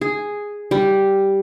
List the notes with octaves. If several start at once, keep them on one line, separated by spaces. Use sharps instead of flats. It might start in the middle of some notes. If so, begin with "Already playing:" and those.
G#4
G3